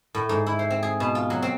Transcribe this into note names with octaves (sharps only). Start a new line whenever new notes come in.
A2
G#2
E4
C5
C4
G#4
B2
F4
F#3
C4